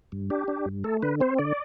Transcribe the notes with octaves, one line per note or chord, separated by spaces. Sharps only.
G2
D4 G4
D4
G2
A3 A4
D3 B4
C4 C5
D3 D5